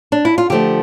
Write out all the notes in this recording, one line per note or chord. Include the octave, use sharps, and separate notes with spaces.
D4
E4
F4
D3 F3 A3 G4